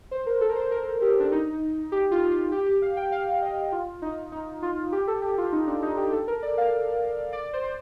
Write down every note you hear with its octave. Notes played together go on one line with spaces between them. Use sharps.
C5
A#4
A4
A#4
C5
A#4
G4
D4
D#4
G4
F4
F4
G4
G4
F5
G5
F5
D#5
F4
D#4
D#4
F4
G4
A4
G4
F4
D#4
D4
D#4
G4
A4
A#4
D5
F5
D5
C5
C5